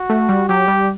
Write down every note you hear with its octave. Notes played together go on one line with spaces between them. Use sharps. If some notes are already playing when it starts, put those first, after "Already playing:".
Already playing: F#4
A3
G3
F#3 G4
G3